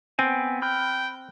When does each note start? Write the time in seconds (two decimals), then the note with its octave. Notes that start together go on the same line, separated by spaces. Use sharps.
0.19 B3 C4 G5 G#5
0.62 G5 B5 F6 F#6